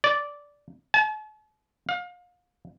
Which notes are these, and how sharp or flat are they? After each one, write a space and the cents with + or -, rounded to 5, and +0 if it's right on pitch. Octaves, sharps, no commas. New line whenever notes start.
D5 -10
A5 -45
F5 +35